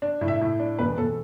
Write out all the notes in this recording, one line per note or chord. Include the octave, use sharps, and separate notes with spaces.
D4
A2
E5
A2
D4
E1 B4
E1 A4